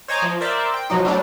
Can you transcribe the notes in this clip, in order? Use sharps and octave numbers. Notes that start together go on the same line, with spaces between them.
C5 C#5 D#5 G#5 A#5 D6
F3
A#4 C5 D5 E5
G5
B2 F3 F#3 D#4
F#3 G3 A3 D4